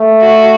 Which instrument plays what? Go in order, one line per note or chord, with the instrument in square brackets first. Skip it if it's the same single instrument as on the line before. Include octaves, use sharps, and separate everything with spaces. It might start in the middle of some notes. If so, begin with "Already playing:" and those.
Already playing: [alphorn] A3
[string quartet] F#4